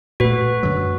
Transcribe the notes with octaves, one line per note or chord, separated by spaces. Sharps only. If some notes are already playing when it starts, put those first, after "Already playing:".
A#2 A3 F#4 B4
F#2 D3 F#3